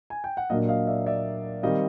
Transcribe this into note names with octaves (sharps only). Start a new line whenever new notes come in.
G#5
G5
F#5
A#2 F#3 A#3 D4 D#5 F5
D#5 F5
D5 E5
D5 E5
D#3 G3 C4 D#5 F5